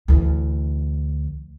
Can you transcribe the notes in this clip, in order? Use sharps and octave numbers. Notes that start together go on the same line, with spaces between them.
D2 E3